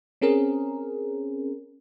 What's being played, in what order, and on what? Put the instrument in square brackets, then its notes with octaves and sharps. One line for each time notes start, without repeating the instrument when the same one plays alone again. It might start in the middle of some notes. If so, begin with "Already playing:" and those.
[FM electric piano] C4 C#4 G#4 A#4